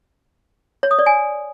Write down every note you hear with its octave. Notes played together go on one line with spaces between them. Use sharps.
C#5
D#6
D5
G#5